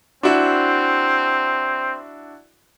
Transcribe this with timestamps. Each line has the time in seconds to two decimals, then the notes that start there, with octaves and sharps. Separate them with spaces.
0.23 C4 D4 E4 F#4